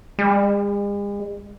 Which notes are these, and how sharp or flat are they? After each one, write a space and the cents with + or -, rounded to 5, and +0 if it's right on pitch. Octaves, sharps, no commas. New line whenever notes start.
G#3 -45